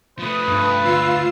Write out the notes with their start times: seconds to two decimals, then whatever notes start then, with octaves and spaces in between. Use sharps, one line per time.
0.19 F3 A3 B4 D#6
0.48 G2
0.84 D2 F4 E6 C7